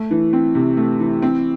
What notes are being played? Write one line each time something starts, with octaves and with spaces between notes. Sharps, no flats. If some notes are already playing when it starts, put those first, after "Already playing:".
Already playing: A3
E3
C4
C3
A3
E3
C4